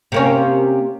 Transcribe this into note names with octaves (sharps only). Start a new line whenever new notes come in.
C3 A#3 C#4